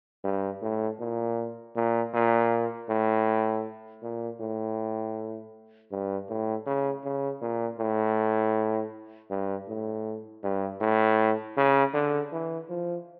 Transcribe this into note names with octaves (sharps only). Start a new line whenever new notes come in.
G2
A2
A#2
A#2
A#2
A2
A#2
A2
G2
A2
C#3
C#3
A#2
A2
G2
A2
G2
A2
C#3
D3
E3
F3